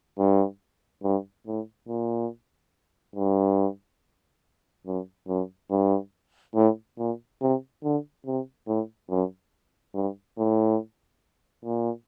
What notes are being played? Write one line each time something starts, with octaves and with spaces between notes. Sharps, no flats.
G2
G2
A2
A#2
G2
F#2
F#2
G2
A2
A#2
C3
D3
C3
A2
F#2
G2
A2
A#2